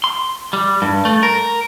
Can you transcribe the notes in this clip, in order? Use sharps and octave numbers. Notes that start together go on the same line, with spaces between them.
C6
G3
G2
A3
A#4